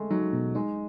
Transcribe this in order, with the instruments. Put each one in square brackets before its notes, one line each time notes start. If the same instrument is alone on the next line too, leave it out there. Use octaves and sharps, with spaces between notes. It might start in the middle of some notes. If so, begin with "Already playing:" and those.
Already playing: [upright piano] G#3 A3
[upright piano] F#3 [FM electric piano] D#4
[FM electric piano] B2
[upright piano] G#3 [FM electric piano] D#4